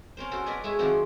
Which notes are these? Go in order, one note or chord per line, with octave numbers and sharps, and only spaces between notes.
C#4 A#4 C5
F#4 A4 A#4 C5
F#4 A#4 B4 D5 D#5 G#5
G#3 A3 E4 G#4
D#3 F3 F#3 A#3 C4 F#4